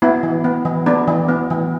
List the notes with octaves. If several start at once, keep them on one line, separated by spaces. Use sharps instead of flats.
B3 E4
E3
B3
E3
B3 D4
E3
B3
E3